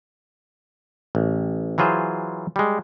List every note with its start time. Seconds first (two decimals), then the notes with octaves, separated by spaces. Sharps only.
1.15 A1
1.78 E3 F#3 F4 G#4 C5
2.56 G3 G#3